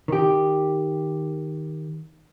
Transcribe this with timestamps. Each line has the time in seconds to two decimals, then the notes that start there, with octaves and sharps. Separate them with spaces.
0.08 D#3 G4